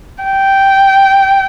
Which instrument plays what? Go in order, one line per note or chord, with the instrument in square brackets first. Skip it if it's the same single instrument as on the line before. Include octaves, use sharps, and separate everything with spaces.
[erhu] G5